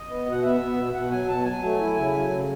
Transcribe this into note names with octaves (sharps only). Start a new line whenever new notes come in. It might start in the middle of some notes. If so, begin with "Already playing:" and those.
Already playing: D#5
B3
B2
F#5
B3 E5
B3
B2
B2 F#5
F#3 G#5
B2 A5
F#3 G#5
A3
E4
C#3
F#3
C#3